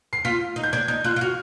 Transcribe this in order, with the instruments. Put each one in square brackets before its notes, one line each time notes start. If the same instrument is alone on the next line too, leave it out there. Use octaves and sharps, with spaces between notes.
[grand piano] C7
[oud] F4 [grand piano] B6
[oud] D#4
[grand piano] G6
[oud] D4 [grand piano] G#6
[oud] D#4 [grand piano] G6
[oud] F4 [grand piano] F#6
[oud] F4
[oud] F#4 [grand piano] F6